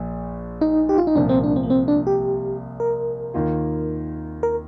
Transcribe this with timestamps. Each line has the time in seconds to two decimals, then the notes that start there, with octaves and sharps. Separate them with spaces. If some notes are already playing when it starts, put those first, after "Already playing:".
Already playing: A#1 A#2
0.61 D#4
0.89 G4
0.98 F4
1.07 D#4
1.16 C2 A#2 F3 D4
1.29 C4
1.44 D4
1.56 C4
1.63 A#3
1.70 C4
1.88 D4
2.07 G4
2.80 A#4
3.34 D#2 D#3 A#3 F4
4.43 A#4